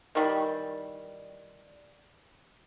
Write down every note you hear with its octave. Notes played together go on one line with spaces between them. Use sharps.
D#3 E3 G3